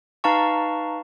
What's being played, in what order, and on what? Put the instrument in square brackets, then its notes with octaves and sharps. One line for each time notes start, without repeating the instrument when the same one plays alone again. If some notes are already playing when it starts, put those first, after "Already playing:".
[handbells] D#4 B4 F5 A5 A#5 C#6